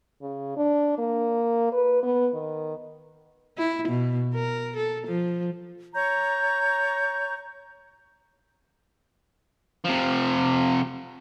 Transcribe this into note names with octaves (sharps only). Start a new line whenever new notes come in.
C#3
D4
A#3
B4
B3
D#3
E4
B2
A#4
A4
F3
C#5 A#5 C#6 G6
C3 F3